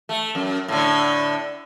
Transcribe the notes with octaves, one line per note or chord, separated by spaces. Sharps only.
A3
F#2
A2 D3